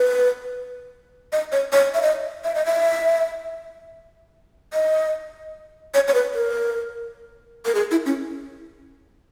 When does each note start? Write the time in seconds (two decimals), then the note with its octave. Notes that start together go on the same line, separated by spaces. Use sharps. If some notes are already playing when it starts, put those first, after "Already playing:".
Already playing: B4
1.32 D#5
1.52 C#5
1.73 C#5
1.94 E5
2.02 D#5
2.44 E5
2.55 D#5
2.66 E5
4.73 D#5
5.94 C#5
6.08 C#5
6.14 B4
6.34 A#4
7.66 A#4
7.75 G#4
7.91 E4
8.06 C#4